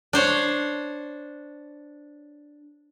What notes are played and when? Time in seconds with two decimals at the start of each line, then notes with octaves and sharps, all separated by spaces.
0.13 D4 C5 C#5